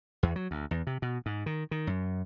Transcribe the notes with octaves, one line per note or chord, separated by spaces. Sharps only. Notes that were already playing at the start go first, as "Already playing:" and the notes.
E2
F#3
D2
E2
C3
B2
G#2
D#3
D#3
F#2